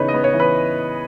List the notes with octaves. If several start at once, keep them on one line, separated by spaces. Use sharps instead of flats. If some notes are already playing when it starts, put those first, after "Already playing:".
Already playing: C#3 E3 B3 D#4 B4 C#5
D#5
B3
C#5
E3
B4